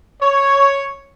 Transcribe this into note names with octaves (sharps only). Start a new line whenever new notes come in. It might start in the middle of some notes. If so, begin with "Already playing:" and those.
C#5